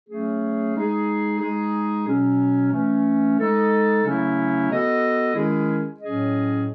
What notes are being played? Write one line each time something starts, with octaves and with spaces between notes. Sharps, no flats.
F#3 A3 C#4 G#4
G#3 D#4 G#4
G#3 D#4 G#4
B2 F#3 C#4
E3 A3 C#4
G#3 D#4 A4 D#5
C#3 F#3 A3 C#4 E4
B3 F#4 A4 D#5
D#3 G#3 C#4 E4 G#4
A2 F#3 C#4 G#4 D#5